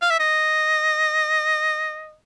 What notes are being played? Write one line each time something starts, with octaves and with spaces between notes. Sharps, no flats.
F5
E5
D#5